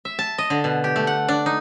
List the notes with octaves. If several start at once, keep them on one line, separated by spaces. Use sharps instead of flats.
E5
A5
D#5
D3
B2
G4
A3
F#5
D4
D#4